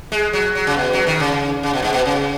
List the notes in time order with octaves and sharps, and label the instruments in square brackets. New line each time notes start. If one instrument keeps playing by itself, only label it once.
[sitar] G#3
F#3
F#3
C#3
B2
F#3
D#3
C#3
C#3
B2
G#2
B2
C#3